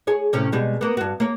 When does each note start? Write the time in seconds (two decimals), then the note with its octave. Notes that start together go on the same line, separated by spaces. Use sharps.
0.07 G#4 C#5
0.33 A2 C3 C#4
0.52 B2 G3 G#3
0.81 A#3 B3
0.97 G2 F#4
1.20 A#3 C#5